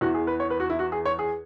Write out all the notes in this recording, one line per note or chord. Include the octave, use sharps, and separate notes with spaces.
E2 E3 F#4
G#4
B4
C#5
B4
F#4
E4
F#4
G#4
C#5
G#4